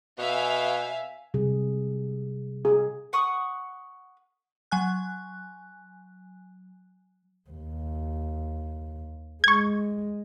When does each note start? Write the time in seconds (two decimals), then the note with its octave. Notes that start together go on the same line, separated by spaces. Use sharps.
0.18 B2 E5 F5 G#5
1.34 C3 G3 G#4
2.65 G#4
3.13 F#5 C#6 D#6
4.71 F#3 G#5 F#6
7.50 D#2
9.44 G#3 C#6 G#6